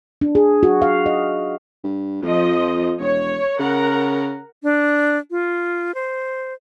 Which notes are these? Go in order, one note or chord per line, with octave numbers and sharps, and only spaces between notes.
D4
G#4
F#4
F5
D#5
G2
F2 F3 D#5
E1 C#5
C#3 A#4 F#5 A#5
D4
F4
C5